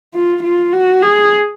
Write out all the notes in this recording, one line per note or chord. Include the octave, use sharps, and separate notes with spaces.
F4
F4
F#4
G#4